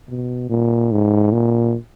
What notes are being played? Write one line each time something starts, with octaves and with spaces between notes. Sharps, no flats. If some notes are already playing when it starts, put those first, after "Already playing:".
B2
A#2
G#2
A#2